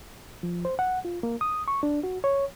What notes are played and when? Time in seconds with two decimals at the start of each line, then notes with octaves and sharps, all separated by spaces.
0.43 F3
0.65 C5
0.79 F#5
1.05 F4
1.23 A#3
1.41 D#6
1.68 C#6
1.83 D4
2.03 F#4
2.24 C#5